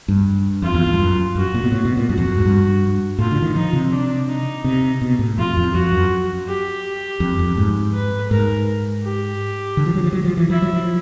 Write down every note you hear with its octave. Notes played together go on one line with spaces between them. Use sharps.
G2
F2 F4
E2
F2
G2
F#2
F#2 F#4
A#2
B2
A2
B2
A#2
F#2 F#4
F2
F#2
G#2
G2
A2 F4
D3
D#3
F3 D#4
C3
D4
D#4
C3
B2
A2
F2 F4
F2
F2 F#4
F#2
G4
F2
F2
G#2
B4
G#2 A#4
G4
D3
F3
F#3
F3
F#3
F3
E3
F3 E4
F#3
F3